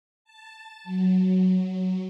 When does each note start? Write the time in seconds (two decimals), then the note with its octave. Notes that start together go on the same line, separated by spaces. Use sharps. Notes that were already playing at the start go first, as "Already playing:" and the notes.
0.24 A5
0.84 F#3